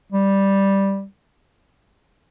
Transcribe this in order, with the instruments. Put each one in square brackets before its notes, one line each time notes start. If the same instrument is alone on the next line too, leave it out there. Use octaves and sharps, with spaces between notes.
[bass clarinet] G3